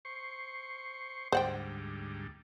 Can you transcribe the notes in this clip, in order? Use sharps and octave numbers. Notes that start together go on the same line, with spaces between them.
C5 C#6
D2 G#2 G3 C5 F#5 G5